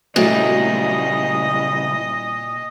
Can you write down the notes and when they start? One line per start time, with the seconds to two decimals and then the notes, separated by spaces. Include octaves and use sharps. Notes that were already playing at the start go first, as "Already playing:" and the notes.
0.16 A#2 C#3 F#3 G3 A3 E4 D#5